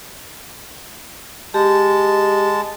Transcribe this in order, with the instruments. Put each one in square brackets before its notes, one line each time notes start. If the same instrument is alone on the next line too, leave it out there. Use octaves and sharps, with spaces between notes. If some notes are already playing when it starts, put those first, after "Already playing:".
[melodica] G#3 A5 [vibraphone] G4